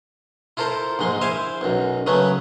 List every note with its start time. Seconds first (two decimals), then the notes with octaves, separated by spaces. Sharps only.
0.57 E4 F4 A4 A#4 C5
0.99 A#1 G#2 G#3 C6
1.21 E4 C5 E5 F5 G#5
1.61 B1 F#2
2.06 C#3 F#3 A3 B3 C#4